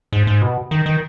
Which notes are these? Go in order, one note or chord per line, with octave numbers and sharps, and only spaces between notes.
G#2
G#2
B2
D#3
D#3